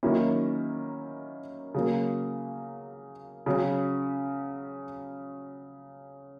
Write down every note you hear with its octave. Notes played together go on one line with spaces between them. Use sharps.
D#3 F#3 A#3 C#4 E4
C#3 F#3 A#3
C#3 F#3 C#4